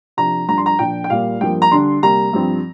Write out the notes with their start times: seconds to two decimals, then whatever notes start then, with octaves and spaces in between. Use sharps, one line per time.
0.17 C3 F3 D4 A#5
0.48 G2 F3 D4 A#5
0.57 C6
0.66 A#5
0.79 A#2 F3 D4 G5
1.04 G5
1.10 A#2 G3 A#3 F5
1.41 G2 F3 A#3 G5
1.62 A#5
1.71 D3 G3 D4 C6
2.02 C3 G3 A#3 A#5
2.33 G2 F3 C4